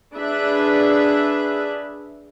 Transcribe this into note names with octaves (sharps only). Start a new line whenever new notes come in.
D4 G#4 B4 E5